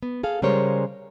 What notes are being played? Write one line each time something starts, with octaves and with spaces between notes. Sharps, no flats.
B3
G#4 A4 F5
C#3 G3 G#3 A#4 C5 C#5